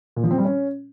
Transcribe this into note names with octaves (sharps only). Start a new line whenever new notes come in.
A#2
F3
C4
G3
C#4